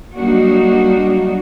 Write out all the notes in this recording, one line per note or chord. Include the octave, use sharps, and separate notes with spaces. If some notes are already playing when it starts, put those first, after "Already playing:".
F#3 G3 A#3 D4 D#4 F#4